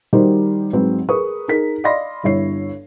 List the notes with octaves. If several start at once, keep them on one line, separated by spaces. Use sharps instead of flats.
D#3 G3 D#4 F#4 A#4 C5
G#2 F#3 C4 B4
G#4 A#4 B4 C#6 D#6
D#4 G#4 A#4 B6
D5 D#5 F5 B5 C6 A#6
G1 G2 E4 C#5 C7